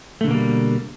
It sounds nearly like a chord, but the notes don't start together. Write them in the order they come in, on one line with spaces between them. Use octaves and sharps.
A3 D3 B2 A#3 G3